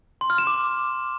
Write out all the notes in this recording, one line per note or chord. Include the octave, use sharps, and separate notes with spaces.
C6
F6
E7
D6